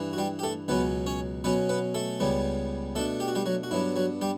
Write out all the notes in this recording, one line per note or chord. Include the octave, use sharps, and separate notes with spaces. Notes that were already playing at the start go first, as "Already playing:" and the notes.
Already playing: G2 E3
F#4
G3 G4
G4
A3 A4
C#2 B2 F#3 B3 C#4 B4
C#4 C#5
B2 F#3 B3 C#4 B4
B3 B4
A3 A4
C#2 C#3 G3 B3
B2 A3 D4 A4
G4
F#4
G3 G4
F#3 F#4
F#4
G2 F#3 B3 D4 E4
F#3 F#4
G3 G4